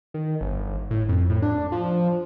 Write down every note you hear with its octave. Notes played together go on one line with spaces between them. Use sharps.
D#3
G1
A2
F2
A2
D4
F3